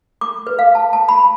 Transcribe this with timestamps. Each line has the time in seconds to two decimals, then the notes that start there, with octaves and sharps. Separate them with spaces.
0.21 D6
0.47 B4
0.59 F5
0.75 A5
0.93 A5
1.09 B5